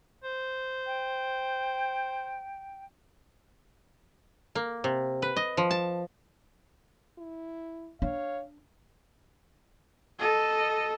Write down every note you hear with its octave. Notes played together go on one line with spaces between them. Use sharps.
C5
G5
A#3
C3
B4
D#5
F3
A5
E4
D4 C#5 F5
A4 D#5